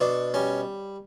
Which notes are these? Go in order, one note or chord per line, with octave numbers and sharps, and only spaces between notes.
B2 D4
G3 C#4